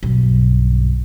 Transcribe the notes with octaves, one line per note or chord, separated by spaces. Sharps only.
B1 G2